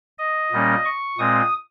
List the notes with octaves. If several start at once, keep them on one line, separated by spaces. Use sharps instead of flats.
D#5
A#2 G3 A#3 C#4
C#6
A#2 G#3 C4 D#6